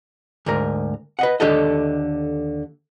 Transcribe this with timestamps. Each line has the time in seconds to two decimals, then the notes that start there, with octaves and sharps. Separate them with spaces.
0.46 D2 G#2 A#4
1.19 B4 D#5 F#5
1.40 D#2 D3 G4 A4 D#5